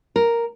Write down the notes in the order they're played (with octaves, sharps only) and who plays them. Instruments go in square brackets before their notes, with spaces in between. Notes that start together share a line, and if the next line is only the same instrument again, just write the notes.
[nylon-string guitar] A#4